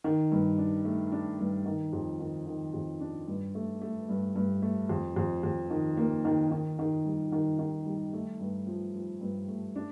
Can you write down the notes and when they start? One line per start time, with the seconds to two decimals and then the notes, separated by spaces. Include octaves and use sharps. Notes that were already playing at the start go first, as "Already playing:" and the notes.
0.04 D#3
0.32 G2
0.58 D4
0.85 A3
1.12 D4
1.39 G2
1.66 D#3
1.93 F2
2.20 D#3
2.47 D#3
2.74 F2
3.01 D4
3.28 G2
3.55 A3
3.81 A3
4.09 G2
4.36 G2
4.62 A3
4.89 F2
5.16 F2
5.43 F2
5.70 D#3
5.97 A#3
6.25 D#3
6.51 D#3
6.79 D#3
7.05 G3
7.32 D#3
7.59 D#3
7.86 G3
8.13 A3
8.40 G2
8.67 F3
8.94 F3
9.21 G2
9.48 A3
9.76 D4